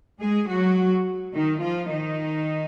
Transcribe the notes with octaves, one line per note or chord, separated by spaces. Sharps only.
G#3 G#4
F#3 F#4
D#3 D#4
F3 F4
D#3 D#4